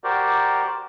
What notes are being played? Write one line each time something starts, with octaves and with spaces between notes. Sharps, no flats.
F#4 G4 A#4 C5 D5